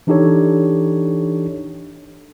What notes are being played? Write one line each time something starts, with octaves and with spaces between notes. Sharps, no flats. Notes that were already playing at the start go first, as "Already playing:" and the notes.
E3 D4 D#4 G4 A4 C#5